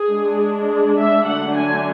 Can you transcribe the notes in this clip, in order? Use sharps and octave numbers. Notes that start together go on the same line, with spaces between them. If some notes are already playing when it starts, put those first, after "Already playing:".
Already playing: G#4
G#3 D4
G#4
E5
D3 F#3 A3 D4 F#5
G#5